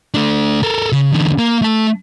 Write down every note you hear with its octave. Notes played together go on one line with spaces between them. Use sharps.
A3 D4
A4 A#4
C#3
E2 D3
A#3
A3 A5